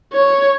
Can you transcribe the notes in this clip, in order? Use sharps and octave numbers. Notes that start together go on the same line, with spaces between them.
C#5